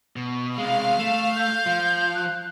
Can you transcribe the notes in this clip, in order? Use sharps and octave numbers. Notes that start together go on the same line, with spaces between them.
B2
C3 G#3 F5
A3 E7
G6
F3
F#6